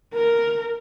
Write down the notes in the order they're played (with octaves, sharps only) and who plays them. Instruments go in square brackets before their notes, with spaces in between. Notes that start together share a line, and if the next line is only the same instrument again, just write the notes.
[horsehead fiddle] A#4